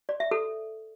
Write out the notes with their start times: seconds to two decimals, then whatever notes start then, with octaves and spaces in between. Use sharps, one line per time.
0.09 D5
0.20 E5
0.31 A4